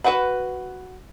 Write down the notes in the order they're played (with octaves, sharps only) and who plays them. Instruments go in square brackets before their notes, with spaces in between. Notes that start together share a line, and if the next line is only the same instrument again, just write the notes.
[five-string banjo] F#4 A#4 B4 F#5 B5